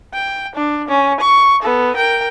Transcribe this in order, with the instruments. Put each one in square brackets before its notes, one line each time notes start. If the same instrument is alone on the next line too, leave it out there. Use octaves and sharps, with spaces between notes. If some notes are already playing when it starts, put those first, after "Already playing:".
[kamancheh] G5
D4
C#4
C#6
B3 A4
A#4 G5